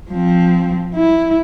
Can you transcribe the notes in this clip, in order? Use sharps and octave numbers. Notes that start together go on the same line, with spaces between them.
F3 C4
E4